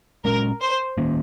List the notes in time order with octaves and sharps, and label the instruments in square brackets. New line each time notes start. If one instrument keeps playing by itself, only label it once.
[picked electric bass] A#2 G#3 C#4 [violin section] A#4
[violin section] C5
[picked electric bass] D#3 A#3 C#4